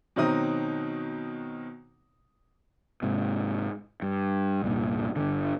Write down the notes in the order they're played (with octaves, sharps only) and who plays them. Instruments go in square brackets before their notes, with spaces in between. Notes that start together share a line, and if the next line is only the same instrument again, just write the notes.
[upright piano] B2 D#3 F#3 C4 D#4 D#6
[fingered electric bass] G#2 C3
G2
C2 G2 A#2
G1 D3